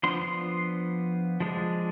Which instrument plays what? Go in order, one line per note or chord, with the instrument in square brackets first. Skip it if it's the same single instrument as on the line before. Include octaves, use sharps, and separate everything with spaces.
[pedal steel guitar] F3 B3 D4 C6
C6
F3 G#3 D4